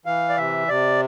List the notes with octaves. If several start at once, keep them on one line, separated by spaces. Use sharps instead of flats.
E3 F5
D5
C3 E5
C3 D5